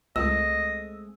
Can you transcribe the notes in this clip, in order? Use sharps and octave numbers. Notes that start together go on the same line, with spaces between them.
C#2 G#3 A3 C4 D#5 E6